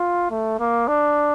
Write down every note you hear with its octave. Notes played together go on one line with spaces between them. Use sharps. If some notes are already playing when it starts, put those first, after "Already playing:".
Already playing: F4
A3
A#3
D4